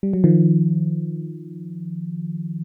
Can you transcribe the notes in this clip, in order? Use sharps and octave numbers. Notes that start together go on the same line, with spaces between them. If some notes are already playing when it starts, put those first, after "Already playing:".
G3
F#3
D#3 F3